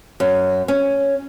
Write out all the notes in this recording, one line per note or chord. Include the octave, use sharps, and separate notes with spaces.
F#2
C#4